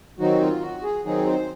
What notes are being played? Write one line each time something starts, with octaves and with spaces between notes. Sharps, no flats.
D#3 F#3 C4 D#4 F#4
F4
F#4
G#4
D#3 F#3 C4 D#4 G#4
C5